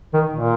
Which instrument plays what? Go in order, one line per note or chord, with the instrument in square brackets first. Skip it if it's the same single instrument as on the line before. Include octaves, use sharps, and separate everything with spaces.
[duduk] D#3
A#2